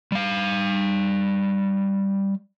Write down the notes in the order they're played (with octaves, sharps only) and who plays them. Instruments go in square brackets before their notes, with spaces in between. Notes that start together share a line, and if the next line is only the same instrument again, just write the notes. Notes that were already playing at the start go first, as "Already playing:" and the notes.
[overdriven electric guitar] G3 F5